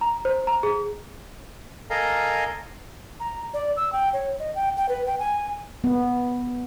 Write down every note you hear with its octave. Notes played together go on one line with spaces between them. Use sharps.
A#5
C5
A#5
G#4
A4 A#4 D#5 F5 G#5 A#5
A#5
D5
E6
G5
C#5
D#5
G5
G5
B4
G5
G#5
B3